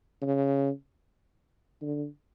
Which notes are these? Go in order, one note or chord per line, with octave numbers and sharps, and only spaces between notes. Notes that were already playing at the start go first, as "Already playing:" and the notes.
C#3
D3